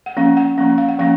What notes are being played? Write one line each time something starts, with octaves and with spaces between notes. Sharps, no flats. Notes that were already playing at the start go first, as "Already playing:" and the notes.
F#5
F3 A#3 C#4 F5
F#5
F3 A#3 C#4 F5
F5
F#5
F3 A#3 C#4 F5